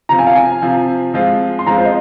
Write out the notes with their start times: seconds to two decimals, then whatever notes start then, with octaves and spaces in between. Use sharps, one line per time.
0.09 C3 F3 C4 F4 A#5
0.19 G#5
0.27 F5
0.35 G#5
0.62 C3 F3 C4 F4
1.14 F3 G#3 C4 F4
1.59 C6
1.66 F3 G#3 C4 F4 A#5
1.77 C5
1.85 D#5